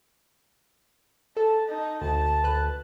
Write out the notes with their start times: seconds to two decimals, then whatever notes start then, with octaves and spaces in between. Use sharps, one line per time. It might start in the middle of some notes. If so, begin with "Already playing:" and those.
1.37 A4 A5
1.68 D#4
2.02 D2 A5
2.43 D2 B4 F#6